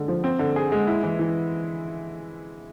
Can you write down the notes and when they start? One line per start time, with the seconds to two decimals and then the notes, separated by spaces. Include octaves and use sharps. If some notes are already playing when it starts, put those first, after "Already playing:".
Already playing: D3 G#3
0.08 F3
0.24 C4
0.39 D3
0.56 G#4
0.72 G#3
0.87 E4
1.03 E3
1.19 E3